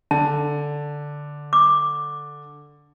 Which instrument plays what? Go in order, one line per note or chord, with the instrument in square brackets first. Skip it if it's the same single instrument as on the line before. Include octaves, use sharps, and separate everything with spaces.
[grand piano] D3 [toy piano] A5
[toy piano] D6